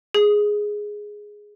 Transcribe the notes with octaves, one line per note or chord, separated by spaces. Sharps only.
G#4